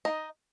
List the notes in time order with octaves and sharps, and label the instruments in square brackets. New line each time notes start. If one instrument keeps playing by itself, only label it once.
[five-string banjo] A#3 D#4 D#5